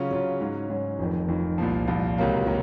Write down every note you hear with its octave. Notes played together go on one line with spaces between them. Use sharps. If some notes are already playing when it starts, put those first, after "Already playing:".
Already playing: C#3 F#3 C#4 F4
C#3 F#3 C#4 F4
G#2 F#3 C#4
G#2 F#3 C#4
F1 F2 D#3
F1 F2 D#3
C2 A#2 F3
C2 A#2 F3
C#2 C3 F#3 A#3 F4
C3 F#3 A#3